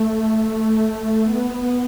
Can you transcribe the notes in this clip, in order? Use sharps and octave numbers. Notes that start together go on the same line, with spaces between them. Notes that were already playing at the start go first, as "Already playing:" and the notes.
Already playing: A3
A3
B3